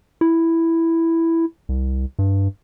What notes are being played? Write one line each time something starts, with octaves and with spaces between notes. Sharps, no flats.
E4
C2
G2